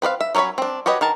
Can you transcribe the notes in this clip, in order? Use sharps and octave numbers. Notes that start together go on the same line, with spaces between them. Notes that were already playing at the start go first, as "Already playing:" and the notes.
C4 B4 D5 F5
E5
F#3 A#3 C#4 C#5 B5
C4 D4
F#4 G4 B4 C#5 D#5
D#3 A#4 A5